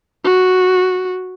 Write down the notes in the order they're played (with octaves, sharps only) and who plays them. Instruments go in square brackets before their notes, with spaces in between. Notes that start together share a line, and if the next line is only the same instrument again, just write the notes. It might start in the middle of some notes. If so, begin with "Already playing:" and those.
[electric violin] F#4